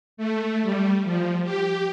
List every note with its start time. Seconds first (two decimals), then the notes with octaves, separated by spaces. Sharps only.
0.17 A3
0.62 G3
1.04 F3
1.43 G4